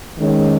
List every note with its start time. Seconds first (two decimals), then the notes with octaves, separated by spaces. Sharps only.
0.16 D#3 G#3 C#4